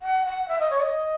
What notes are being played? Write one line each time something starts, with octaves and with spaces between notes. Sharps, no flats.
F#5
F#5
E5
D#5
C#5
D#5